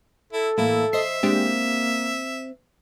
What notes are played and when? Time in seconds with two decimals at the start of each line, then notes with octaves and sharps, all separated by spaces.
0.33 E4 A4
0.58 A2 E3 A#3 E4
0.93 C5 D#5 E5 C7
1.23 G#3 A#3 C4 D4 G4